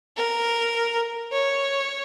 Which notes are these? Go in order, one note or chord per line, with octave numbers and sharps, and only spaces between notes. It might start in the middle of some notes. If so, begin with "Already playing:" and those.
A#4
C#5